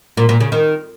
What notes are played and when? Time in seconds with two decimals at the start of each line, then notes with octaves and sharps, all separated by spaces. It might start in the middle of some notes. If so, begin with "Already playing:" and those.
0.17 A#2
0.29 A#2
0.40 C#3
0.52 D#3